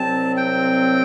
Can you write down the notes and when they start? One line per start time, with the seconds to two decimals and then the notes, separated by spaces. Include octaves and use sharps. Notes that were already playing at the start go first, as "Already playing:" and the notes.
Already playing: C2 C3 F#3 C4 A5
0.37 G5